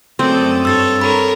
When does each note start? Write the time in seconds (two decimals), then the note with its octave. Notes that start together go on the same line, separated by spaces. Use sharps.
0.19 F#2 A3 C4 A4 D5 D#6
0.65 G2 A4 C#5 E6 A6
1.01 A4 A#4 C#5 B5